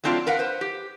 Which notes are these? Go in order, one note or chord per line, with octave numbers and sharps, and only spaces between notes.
F#3 A3 C4 D4 F4
A#4 B4 F5 F#5
B4 C5
G4